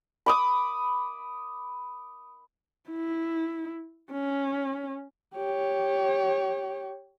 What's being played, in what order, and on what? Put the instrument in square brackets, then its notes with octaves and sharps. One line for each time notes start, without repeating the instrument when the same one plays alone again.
[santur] B5 D6 D#6
[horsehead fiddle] E4
C#4
G4 C#5